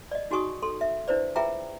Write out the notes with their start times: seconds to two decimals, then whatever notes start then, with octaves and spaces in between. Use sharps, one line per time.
0.11 D5 D#5
0.31 D#4 F#4 G#4 G#5 C#6 D#6
0.62 A4 C6
0.81 E5
1.08 D4 E4 B4 C5 D5
1.36 F4 G#4 B4 E5 G5 A#5